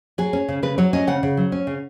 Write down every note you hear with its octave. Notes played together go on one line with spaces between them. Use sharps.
F#3 G#4
C#4
C#3
C#3 B4
F#3 C#5
C#4 D#5
C#3 F#5
C#3
F#3
C#4
C#3